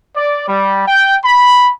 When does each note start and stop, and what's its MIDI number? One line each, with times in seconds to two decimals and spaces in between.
0.17 0.46 74
0.48 0.88 55
0.88 1.19 79
1.25 1.72 83